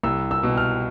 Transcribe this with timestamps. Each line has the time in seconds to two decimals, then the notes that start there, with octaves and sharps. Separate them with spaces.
0.03 C2 E6
0.31 E6
0.43 B2
0.57 F6